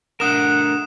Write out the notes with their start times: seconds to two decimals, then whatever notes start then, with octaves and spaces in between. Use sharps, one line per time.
0.20 A3 D4 A#4 F#5 D#6 E7